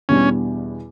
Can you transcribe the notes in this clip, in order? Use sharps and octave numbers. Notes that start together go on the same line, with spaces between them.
E2 B2 G3 B3 C#4 D4